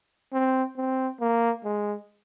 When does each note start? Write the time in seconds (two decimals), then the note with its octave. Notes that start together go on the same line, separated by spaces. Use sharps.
0.33 C4
0.77 C4
1.20 A#3
1.64 G#3